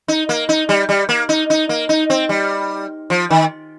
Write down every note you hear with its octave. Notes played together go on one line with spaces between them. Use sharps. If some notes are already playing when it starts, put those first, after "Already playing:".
D#4
A#3
D#4
G3
G3
A#3
D#4
D#4
A#3
D#4
C4
G3
F3
D#3